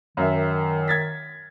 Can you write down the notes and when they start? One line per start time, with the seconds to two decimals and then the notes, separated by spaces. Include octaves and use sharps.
0.17 F#2 D#3 E5
0.88 G#6 A6 B6